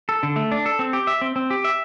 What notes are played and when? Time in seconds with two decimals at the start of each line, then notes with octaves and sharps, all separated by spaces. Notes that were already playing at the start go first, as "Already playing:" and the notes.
0.09 A4
0.23 D3
0.36 A3
0.51 D4
0.66 A4
0.79 C4
0.93 G4
1.07 E5
1.21 C4
1.36 C4
1.50 G4
1.65 E5